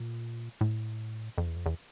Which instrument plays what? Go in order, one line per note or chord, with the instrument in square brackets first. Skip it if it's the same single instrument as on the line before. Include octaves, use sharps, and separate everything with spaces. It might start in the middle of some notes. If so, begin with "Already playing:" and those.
Already playing: [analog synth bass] A#2
A2
F2
E2
F2
E2